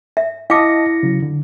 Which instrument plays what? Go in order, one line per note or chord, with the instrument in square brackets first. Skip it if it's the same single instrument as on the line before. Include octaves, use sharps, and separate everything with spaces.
[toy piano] E5
[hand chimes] E4 A#6 C#7 [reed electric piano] D#5 A5 D#6 [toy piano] F5 D6
[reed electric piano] C#3 F#3
D3